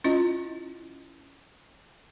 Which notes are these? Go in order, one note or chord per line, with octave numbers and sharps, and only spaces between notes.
C#4 E4 F4 D#5